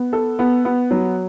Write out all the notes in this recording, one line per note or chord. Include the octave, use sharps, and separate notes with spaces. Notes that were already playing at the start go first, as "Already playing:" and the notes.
Already playing: B3
A4
B3
B3
F#3